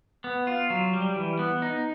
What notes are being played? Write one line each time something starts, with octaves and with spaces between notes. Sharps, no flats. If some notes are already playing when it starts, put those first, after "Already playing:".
B3
F4
F#3
G3
E3
B3
D#4